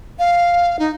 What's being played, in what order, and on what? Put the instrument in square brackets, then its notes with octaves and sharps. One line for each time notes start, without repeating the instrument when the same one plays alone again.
[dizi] F5
D#4